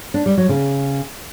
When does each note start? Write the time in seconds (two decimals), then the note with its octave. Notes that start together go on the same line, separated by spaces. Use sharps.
0.14 D4
0.26 G3
0.37 F#3
0.49 C#3